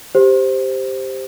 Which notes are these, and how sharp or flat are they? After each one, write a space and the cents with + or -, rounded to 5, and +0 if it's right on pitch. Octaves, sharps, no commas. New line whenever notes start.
G4 +0 C5 +0